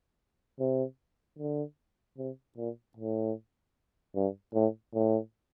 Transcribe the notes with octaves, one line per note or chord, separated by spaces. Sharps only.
C3
D3
C3
A#2
A2
G2
A2
A2